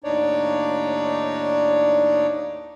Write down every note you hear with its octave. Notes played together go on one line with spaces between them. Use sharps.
D#2 A2 D4 D#4 C#5 D5